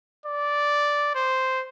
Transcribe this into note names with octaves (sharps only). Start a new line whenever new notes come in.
D5
C5